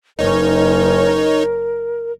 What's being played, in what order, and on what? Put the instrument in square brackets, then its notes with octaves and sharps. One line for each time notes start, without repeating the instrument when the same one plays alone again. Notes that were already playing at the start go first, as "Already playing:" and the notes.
[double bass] F#1 C#4 [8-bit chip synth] D#4 C#5 [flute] A#4